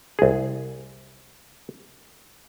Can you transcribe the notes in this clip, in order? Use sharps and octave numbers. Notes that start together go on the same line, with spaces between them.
C2 G#4